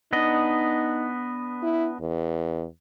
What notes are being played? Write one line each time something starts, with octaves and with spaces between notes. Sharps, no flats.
B3 D4 D#4 D#5
E4
E2